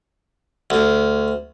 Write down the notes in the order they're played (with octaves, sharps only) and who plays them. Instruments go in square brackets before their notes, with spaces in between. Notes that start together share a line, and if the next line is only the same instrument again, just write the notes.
[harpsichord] D2